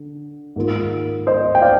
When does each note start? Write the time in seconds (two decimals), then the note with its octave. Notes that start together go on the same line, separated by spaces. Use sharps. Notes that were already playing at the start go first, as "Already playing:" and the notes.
Already playing: D3
0.56 G#2 D#3 A#3 F4
1.27 C5 D#5
1.55 G5
1.62 D5 F5